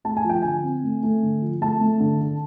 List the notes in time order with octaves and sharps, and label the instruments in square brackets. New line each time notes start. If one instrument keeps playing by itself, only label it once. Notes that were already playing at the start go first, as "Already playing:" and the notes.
[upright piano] A3 A5
G#5
F3
G5
D3 G#5
C4
A3
A3
D3
F3
A3 A5
A3
D3
D3